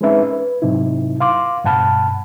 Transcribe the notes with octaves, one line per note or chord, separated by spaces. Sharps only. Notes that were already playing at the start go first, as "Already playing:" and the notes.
G#3 C4 C#4 D#4 B4 E5
B4
G#2 C3 F#3 D#4 E4
F5 C6 D6
G2 B2 F#5 A5 B5 F6